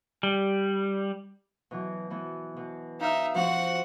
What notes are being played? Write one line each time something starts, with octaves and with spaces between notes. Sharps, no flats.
G3
B2 E3 F#3
E3 B3
B2
D#4 E5 F5 F6
F3 C4 F#4 F#5